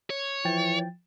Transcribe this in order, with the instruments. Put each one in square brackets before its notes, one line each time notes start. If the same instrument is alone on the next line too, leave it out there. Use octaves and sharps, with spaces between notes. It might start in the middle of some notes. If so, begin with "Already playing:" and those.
[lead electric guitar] C#5
[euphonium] E3 [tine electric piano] F3 G5 A6